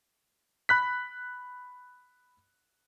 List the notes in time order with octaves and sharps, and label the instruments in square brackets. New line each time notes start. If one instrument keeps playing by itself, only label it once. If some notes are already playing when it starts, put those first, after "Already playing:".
[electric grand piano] B5 F#6 B6